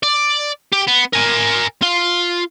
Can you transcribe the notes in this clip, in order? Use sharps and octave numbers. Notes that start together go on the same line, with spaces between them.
D5
G4
B3
A#4 G#5
F4